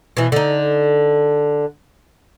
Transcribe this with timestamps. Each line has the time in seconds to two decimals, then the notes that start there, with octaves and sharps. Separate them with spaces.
0.17 B2 E3
0.32 D3 D#4